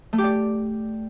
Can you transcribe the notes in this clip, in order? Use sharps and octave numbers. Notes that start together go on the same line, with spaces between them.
A3
G4
D5